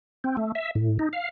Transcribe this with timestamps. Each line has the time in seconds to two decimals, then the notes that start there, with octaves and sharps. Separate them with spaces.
0.24 C4
0.37 A3
0.55 E5
0.75 A2
0.99 D#4
1.13 F5